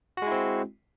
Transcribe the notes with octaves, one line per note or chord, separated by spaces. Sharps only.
G#3 C4 E4 F#4